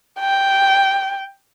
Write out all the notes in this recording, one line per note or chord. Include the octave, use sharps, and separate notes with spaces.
G5